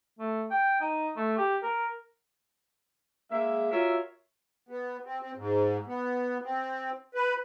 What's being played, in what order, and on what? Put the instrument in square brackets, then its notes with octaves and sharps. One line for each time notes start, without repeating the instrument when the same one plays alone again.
[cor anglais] A3
G5
D#4
A3
G4
A#4
[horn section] G#3 A#3 E5
F4 F#4 A#4 C#5 E5
[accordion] B3
C4
C4
G#2
B3
C4
B4